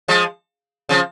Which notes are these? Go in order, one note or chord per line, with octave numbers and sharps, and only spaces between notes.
F3 G#3
C#3 F3